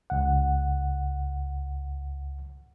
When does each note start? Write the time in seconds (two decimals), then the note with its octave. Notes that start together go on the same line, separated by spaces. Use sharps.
0.10 C#2 F#5